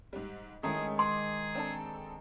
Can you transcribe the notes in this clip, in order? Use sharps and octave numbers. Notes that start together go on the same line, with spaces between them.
G#2 G3
D#3 G#3 A3 C#4 E4 G#4
G#4 C6 D6
C4 D4 A4